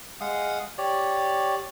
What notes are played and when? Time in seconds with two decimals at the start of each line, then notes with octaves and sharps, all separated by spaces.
0.21 G#3 F5 F#5 D#6
0.78 G4 C#5 D5